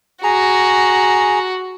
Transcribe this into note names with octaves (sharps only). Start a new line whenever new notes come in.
F#4 G#4 A#5